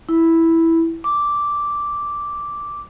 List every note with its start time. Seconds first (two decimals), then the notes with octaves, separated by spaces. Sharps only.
0.09 E4
1.04 D6